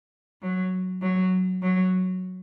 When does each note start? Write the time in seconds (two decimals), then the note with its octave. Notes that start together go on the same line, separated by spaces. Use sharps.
0.42 F#3
1.02 F#3
1.63 F#3